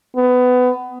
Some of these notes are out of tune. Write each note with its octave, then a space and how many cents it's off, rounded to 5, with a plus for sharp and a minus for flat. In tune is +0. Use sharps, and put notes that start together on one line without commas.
B3 +20